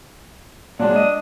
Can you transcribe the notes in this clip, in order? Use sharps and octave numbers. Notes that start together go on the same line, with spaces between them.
A#2 F#3 G#3 D4
D#5